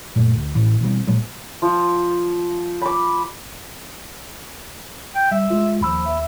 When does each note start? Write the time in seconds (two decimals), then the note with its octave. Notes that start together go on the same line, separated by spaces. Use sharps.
0.16 F#2 A#2 A3
0.35 D2
0.55 A1 A2 E3
0.81 B2 E3 G3 C4
1.07 A#2 F3 F#3 G#3
1.62 F3
2.82 B5 D6
5.15 G5
5.31 G3 E5
5.50 G#3 F4
5.81 D#2 F3 B5 E6
6.05 E5